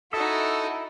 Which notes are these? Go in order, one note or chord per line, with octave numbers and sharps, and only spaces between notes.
D#4 E4 F#4 A4 D#5 E5